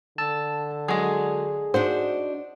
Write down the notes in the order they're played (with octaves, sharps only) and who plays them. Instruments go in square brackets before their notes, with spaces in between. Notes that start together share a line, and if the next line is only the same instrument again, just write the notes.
[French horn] D3 [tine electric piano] A5 E6
[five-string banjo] F#3 G#3 [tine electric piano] G#4
[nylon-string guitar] D4 D#4 F#4 [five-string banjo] C5